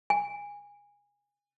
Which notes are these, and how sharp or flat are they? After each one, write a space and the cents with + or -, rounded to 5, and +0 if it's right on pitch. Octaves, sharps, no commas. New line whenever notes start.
G#5 -20